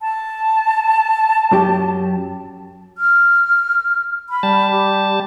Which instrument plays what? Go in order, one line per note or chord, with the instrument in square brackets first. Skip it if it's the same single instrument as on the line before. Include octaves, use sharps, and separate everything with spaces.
[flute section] A5
[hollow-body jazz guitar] F#2 F#3 G4
[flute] F6
B5
[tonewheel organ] G3 A5
[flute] G4